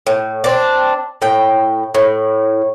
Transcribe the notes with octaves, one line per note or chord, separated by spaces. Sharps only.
A2
C4 D4
A2 G5
A2